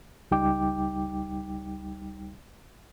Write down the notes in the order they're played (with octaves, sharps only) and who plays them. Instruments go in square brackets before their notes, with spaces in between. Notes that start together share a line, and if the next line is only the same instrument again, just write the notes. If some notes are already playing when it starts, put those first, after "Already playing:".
[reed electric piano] C#2 G3 D#4 G5 D6